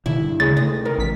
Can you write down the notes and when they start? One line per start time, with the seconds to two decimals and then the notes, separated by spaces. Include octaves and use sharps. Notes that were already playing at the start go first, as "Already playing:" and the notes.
0.06 B2 D3 D#3 E4
0.21 G2
0.40 D2 C#3 G#3 A6
0.57 C3 A3 D#5
0.85 D#3 A#4
0.98 A1 B6